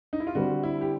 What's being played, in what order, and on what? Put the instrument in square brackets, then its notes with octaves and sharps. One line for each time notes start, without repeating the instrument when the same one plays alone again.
[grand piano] D#4
E4
F4
[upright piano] D3 G3 C4 [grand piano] F#4
[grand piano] E4
G4